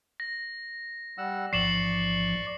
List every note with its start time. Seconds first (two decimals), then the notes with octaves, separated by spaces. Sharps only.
0.20 A#6
1.18 G3 F#5 E6
1.53 A1 G#2 F3 D5 C#6 C7 E7 F#7